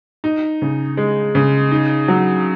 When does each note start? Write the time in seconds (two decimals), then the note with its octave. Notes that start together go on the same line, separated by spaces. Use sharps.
0.24 D#4
0.62 C#3
0.97 G#3
1.35 C#3
1.71 D#4
2.08 F#3